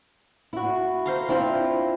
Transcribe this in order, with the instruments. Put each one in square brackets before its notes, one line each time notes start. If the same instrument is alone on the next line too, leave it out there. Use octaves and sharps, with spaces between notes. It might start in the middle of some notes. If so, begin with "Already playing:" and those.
[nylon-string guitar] E4 F#4
[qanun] C5 F5 A#5
[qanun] C4 [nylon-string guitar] D4 E4 F4